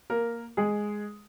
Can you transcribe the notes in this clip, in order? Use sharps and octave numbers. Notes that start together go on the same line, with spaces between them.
A#3 A#4
G#3 G#4